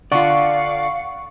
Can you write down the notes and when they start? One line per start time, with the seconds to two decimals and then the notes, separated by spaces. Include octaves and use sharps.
0.12 D3 F4 D5 F5 F#5 C#6 C#7